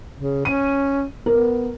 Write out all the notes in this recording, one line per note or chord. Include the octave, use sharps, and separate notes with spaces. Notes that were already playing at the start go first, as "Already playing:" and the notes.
C#3
C#4 D#7
B3 A#4